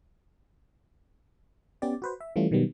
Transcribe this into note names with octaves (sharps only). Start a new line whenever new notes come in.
B3 C#4 G4 D5
F#4 B4 C5
E5
E3 G3 A3 C#4 F4
B2 D#3 F#3 G3 B3